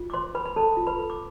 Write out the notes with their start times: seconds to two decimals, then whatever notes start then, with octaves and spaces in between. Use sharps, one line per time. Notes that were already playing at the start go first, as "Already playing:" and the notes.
Already playing: F4
0.10 D6
0.13 B4 C5 C6
0.35 B4 B5
0.45 B5
0.56 A4 C5 A5
0.77 F4
0.87 B4 B5
0.98 A4
1.10 D6